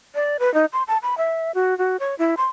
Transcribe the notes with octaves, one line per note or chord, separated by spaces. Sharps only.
D5
B4
D#4
C6
A5
B5
E5
F#4
F#4
C#5
E4
C6